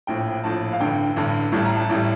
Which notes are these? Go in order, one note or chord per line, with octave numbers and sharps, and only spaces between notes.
A#1 A2 F3 G5
A#1 A2 F3 A5
F5
A1 G2 D3 G5
A1 G2 D3
A1 A2 G3 A5
A#5
A5
A1 A2 G3